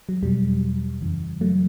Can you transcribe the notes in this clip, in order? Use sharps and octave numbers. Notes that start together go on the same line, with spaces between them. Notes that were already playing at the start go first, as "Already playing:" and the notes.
F#3
E2 B2 F#3 G3
F#2 C#3 E3
F#3 A3